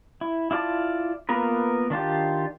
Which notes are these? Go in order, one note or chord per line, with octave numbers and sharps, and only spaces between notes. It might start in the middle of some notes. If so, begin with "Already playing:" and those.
E4
E4 F4 D5 A5 D6
A#3 B3 F4 A#4 B4
D#3 D4 F4 G4